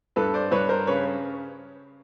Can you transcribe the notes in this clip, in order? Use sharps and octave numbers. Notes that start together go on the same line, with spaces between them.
G2 A4 B4
C5 D5
G2 B4 C#5
A#4 C5
C#3 B4 C#5